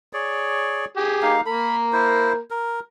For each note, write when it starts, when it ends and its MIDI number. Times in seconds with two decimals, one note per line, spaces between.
0.13 0.85 68
0.13 0.85 73
0.13 0.85 74
0.97 1.34 67
0.97 1.34 68
1.22 1.41 58
1.22 1.41 63
1.22 1.41 77
1.46 2.39 58
1.46 2.39 70
1.46 1.76 83
1.93 2.33 64
1.93 2.33 72
2.50 2.80 70